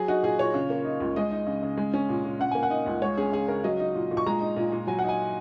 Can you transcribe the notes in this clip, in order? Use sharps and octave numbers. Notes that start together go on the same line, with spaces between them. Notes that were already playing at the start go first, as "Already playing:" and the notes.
Already playing: F#3 G#4
D#4 F#4
A#2 G#4
A#2 C#5
C#3
A#3
D#4
C#2
G#3 D#5
D#4
C#3
C#3
G#3
C#4
A#2
A#2
C#3 F#5
A#3 G#5
F#5
D#4
C#2
G#3 C#5
C#4 G#4
C#3 G#4
C#3 A#4
F#3 D#5
D#4
A#2
A#2
C#6
G#3 A#5
D#4
A#2
A#2
F#3 G#5
F#5
D#4
G#5